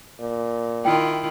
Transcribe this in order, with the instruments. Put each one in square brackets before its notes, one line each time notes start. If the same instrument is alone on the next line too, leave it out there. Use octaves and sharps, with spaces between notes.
[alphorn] A#2
[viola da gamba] D#3 E4 F4 [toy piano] G5